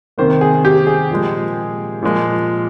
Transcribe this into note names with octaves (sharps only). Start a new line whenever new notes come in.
C3 D#3 A#3 C5
G#4
G4
G#4
A#2 F3 G#3
A#2 F3 G#3